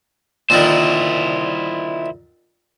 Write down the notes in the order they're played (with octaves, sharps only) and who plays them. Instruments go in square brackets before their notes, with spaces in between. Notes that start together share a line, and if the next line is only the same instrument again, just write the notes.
[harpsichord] A#2 D3 D#3 [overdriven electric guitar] E4 C5